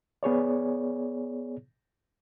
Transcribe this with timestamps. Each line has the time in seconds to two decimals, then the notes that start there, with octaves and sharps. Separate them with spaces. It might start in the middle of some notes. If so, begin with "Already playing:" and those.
0.23 B3 G#4 C#5 D5